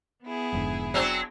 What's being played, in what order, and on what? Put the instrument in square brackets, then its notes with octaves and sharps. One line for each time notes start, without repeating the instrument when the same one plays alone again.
[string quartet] B3 E4 G#4
[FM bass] F1 [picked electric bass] F2 G#2 D3
[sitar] F#3 C4 D4